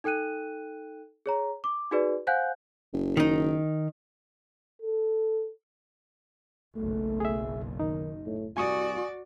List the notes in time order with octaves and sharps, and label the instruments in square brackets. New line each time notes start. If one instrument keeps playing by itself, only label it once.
[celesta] D#4 A4 G5 F#6 D#7
G#4 C#5 A#5
D6
D#4 F#4 G#4 B4 D5
C5 F5 F#5 G#5 F#6 G6
[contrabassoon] F#1
[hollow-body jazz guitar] D#3 D#4
[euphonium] A4
[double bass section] F#1 B1 [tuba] A3
[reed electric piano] G#4 E5
[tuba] D#3 [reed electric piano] D#4
[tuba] A2
[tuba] C2 [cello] F#4 D5 [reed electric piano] G#5 C#6 D#6